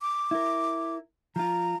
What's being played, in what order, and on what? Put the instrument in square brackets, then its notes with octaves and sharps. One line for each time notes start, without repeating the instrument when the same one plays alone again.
[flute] D6
[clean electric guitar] E4 A#4
[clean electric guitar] F3 F4 [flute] A#5